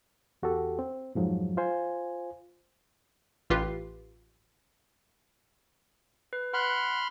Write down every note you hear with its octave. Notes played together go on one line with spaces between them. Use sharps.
E2 F#4 G4 A4
C4
F2 G#2 F3 F#3
F4 C5 G#5
A1 F4 G4 B4 C7
B4
F#5 B5 C6 F6 F#6